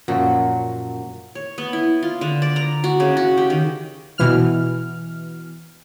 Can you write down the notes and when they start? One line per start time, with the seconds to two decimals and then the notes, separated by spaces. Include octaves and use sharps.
0.08 F#2 A#2 F3 F#3
1.35 C#5
1.58 B3
1.73 E4
2.03 F4
2.21 D3
2.42 D5
2.56 A#5
2.84 F#4
3.00 C#3
3.17 F#4
3.38 G4
3.50 D#3
4.18 B2 E3 F6